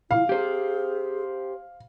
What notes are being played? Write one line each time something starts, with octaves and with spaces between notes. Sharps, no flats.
E4 F5
G4 G#4 C5